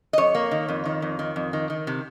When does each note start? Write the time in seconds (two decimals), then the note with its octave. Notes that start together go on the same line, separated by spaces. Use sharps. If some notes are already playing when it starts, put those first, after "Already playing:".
0.13 D#5
0.18 F2 C#5
0.35 A#3
0.51 D#3
0.68 F2
0.85 D#3
1.02 F2
1.19 D#3
1.36 F2
1.53 D#3
1.70 D#3
1.87 C3